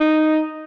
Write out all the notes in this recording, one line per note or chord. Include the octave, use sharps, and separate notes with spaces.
D#4